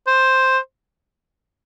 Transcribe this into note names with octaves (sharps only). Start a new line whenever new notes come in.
C5